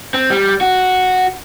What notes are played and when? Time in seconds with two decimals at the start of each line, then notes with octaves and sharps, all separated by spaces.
0.14 C4
0.30 G3
0.61 F#4